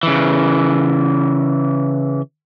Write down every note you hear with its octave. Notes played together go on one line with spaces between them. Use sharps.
C#3 E3